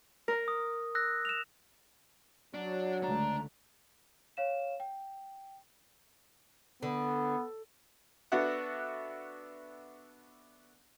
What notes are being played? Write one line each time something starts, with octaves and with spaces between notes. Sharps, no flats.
A#4
D#6
E6 F#6 A#6
E7 F7
F#3 D4
C#2 D3 A3 D4 A#5
C#5 F5 E7
G5
D3 B3
B3 D4 F#4 A4 E5 F#5